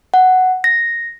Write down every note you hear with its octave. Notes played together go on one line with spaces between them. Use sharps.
F#5
A#6